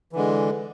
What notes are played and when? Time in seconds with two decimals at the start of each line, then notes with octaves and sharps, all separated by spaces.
0.12 E3
0.16 D3
0.19 G#3